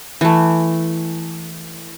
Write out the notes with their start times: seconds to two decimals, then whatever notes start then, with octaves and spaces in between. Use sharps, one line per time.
0.21 E3 A3